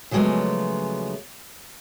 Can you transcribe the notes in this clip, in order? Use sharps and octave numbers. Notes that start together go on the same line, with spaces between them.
C#3 F3 F#3 G#3 A3 B3